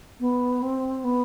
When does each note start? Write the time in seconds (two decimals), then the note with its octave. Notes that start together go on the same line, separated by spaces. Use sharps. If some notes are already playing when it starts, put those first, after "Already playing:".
0.20 B3
0.62 C4
1.04 B3